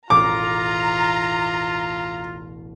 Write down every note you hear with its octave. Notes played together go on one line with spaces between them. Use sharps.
E1 A1 F4 A#5 D6